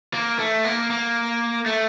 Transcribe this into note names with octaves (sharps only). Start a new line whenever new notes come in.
A#3
A3
A#3
A#3
A3